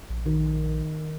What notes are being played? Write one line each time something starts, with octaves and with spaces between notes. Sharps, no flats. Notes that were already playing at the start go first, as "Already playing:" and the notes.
A#1
D#3